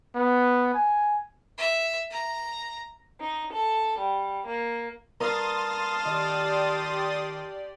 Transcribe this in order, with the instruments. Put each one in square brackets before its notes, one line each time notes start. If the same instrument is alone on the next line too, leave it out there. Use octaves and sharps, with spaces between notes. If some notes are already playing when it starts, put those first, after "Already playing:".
[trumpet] B3
G#5
[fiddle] E5
A#5
[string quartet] D#4
A4
G3
A#3
[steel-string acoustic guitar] G2 A#4 A#5 [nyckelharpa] F5 A5 [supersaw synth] C6 D#6 A6
[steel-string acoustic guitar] D#3 [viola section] G4 D5